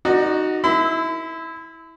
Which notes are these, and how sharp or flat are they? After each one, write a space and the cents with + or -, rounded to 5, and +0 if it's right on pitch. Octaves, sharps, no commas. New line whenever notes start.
D#4 +0 F#4 +0 D5 +35
E4 -20 B5 +40 E6 +0